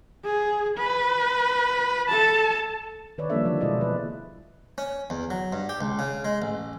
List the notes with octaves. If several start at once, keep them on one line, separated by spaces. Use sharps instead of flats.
G#4
B4
A4 A5
D#3 B4 C#5 D5
F3 G3 A#3 D4 A4 E5
D3 E3 F3 A#3
B2 G#3 E4 C5 D5 D#5
E4 B4
C#4
E2
F#3
G2
G4
C#2
C#3
G#3
A1